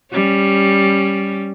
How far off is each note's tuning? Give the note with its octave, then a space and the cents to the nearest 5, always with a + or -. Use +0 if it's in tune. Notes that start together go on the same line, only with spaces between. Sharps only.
G3 +0 C#4 +0